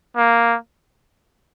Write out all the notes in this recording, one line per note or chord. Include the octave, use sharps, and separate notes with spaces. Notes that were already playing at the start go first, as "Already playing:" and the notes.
A#3